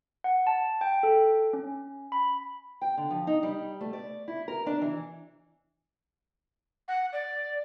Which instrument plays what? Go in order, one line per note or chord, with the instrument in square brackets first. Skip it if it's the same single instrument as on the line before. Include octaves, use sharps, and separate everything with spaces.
[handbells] F#5
A5
G5
A4
C#4
B5
[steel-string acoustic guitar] G5
D3
F3
D#4
G3
A3
D5
E4
A#4
D4
E3
[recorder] F#5
D5